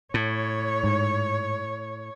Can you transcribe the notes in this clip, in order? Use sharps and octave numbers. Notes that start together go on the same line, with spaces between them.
A2 C#5
G#2